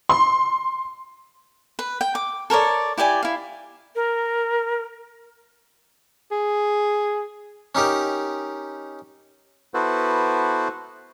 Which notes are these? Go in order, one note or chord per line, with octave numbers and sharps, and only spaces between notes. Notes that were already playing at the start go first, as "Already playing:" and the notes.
C6
B4
G5
D6
A4 A#4 C#5 D5
E4 G4 D5 G#5
E4 F5
A#4
G#4
C#4 D#4 G4 A#4
B3 E4 F#4 A4 B4 C5